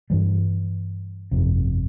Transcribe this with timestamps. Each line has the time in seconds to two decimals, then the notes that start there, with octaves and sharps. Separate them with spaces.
0.10 G2 E3 G3
1.31 G1 F2 C3